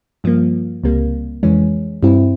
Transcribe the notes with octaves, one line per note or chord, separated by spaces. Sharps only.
G2 F3 A#3
C#2 C3 G3 A#3
F2 C#3 E3 G#3 C#4
G2 G3 C4 E4